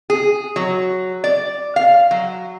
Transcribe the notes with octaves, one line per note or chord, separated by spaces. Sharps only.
G#4
F#3
D5
F5
F#3